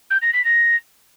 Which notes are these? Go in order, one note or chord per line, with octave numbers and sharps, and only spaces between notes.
G6
A#6
B6
A#6